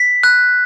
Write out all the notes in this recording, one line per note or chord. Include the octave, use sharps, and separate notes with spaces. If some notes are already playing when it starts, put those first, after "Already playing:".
Already playing: B6
F#6